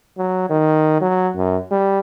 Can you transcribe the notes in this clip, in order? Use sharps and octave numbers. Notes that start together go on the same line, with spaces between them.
F#3
D#3
F#3
F#2
G3